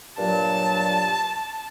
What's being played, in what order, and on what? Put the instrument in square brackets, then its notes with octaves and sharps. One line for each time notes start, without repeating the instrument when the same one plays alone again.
[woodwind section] G2 A#2 F#3 [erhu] A5